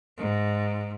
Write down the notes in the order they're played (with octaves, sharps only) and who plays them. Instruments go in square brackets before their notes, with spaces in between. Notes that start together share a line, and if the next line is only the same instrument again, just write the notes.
[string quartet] G#2